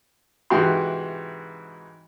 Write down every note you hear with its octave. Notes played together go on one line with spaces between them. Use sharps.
G#2 C3 E3 F#4 G5 C6